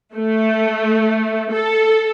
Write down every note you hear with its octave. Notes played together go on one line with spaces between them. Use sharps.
A3
A4